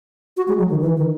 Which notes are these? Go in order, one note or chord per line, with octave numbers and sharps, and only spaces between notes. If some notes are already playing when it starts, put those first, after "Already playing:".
F#4
G#3
F#3
D#3
E3
D#3